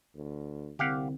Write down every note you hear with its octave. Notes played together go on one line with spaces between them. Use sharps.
D2
C2 D3 C4 G4 F5 F#5